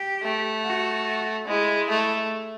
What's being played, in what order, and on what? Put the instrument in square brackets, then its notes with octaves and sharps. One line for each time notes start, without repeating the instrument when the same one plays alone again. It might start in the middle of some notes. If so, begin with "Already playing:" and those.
Already playing: [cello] G4
[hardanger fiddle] A3
[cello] F#4
[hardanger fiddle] G#3 [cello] E4
[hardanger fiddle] A3